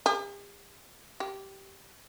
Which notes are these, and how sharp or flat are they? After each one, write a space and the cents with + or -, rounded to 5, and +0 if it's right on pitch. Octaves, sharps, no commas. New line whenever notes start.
G4 +45
G4 -10